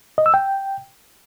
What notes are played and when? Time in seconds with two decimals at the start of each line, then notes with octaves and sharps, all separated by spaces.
0.18 D#5
0.26 E6
0.34 G5